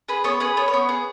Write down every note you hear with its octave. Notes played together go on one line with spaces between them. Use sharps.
G#4 B4
B3 C#5
G#4 B4
B3 C#5
C#5
B3
G#4